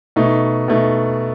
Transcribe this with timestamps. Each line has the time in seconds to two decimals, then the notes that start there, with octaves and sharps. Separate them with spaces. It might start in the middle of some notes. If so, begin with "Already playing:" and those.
0.16 B2 A3 D#4
0.68 B2 A3 D#4